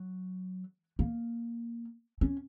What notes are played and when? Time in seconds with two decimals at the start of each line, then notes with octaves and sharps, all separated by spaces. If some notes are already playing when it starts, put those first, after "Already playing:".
Already playing: F#3
0.99 A#3
2.21 C#4